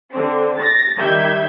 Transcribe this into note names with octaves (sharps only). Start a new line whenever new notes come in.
D3 C4
A6 A#6
D#3 G3 E5 G6 G#6